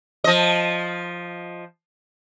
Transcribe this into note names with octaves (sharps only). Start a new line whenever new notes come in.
F3 D#5